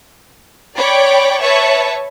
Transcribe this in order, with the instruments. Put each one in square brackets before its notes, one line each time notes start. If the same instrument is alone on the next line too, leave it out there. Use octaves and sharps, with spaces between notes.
[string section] C#5 D5 G5 B5 D6
B4 C#5 E5 A5 C#6